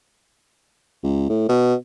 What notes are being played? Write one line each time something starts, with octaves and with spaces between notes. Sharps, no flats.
C#2
A2
B2